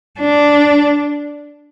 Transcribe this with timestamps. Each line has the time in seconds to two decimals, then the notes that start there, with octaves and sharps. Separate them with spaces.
0.20 D4